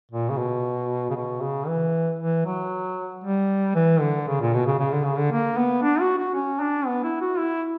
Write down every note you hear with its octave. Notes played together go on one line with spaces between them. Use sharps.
A#2
C#3
B2
C#3
B2
C#3
E3
E3
F#3
G3
E3
D3
C#3
A#2
B2
C#3
C#3
D3
C#3
D3
A#3
B3
D4
F#4
F#4
C#4
D4
B3
E4
F#4
E4